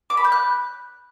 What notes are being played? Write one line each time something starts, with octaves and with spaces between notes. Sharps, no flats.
D6
B5
G6
F#6